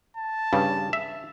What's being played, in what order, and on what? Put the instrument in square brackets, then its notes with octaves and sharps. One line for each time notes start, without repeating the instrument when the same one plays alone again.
[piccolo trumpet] A5
[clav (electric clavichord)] G2 C#3 G3
E5